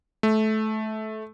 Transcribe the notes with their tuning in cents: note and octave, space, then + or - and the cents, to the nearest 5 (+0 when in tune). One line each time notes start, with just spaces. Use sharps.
A3 -20